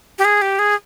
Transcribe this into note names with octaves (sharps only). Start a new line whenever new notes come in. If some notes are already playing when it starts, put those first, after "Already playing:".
G4
G#4
G4
G#4